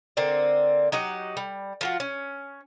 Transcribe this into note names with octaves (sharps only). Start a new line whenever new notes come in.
D3 A#3 C4 D5
F#3 D#4 G4 F#5
G3
F3 F4 F#4
C#4